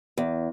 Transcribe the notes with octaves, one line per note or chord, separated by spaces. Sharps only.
E2